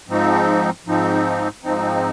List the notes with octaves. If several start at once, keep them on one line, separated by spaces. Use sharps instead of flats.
G#2 F3 C4 D#4
G#2 F3 C4 D#4
G#2 F3 C4 D#4